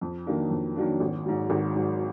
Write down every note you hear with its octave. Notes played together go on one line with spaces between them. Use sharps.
F2
D#3 F#3 A#3 D4
F2
D#3 F#3 A#3 D4
G#1
G#2 F#3
G#1
G#2 F#3